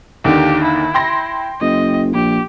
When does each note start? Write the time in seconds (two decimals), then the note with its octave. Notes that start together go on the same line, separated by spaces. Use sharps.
0.25 D#2 D3 D#3 G4
0.64 E4
0.94 G5 C6 A#6
1.61 F#1 D#5
2.14 A#1 G4